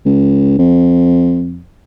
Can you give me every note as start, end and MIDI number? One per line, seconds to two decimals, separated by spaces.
0.05 0.56 37
0.58 1.65 41